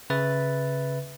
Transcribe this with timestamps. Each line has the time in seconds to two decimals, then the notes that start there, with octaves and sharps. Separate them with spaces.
0.10 C#3 B4 E5 A6